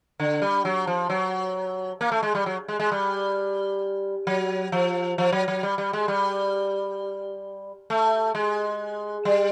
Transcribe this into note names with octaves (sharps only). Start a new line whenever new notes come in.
D3
G3
F#3
F3
F#3
A#3
A3
G#3
G3
F#3
G#3
G#3
G3
F#3
F3
F3
F#3
F#3
G3
G3
G#3
G3
A3
G#3
G3